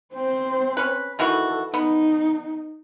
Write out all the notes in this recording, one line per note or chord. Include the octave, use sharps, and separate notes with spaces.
C4 C5
C#4 B4
D#3 E3 F#4 A4
B3 D#4